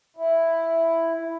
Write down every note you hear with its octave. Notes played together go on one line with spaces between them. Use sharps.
E4